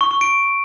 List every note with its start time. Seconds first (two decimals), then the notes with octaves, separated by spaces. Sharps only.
0.01 C#6
0.11 C#6
0.21 D7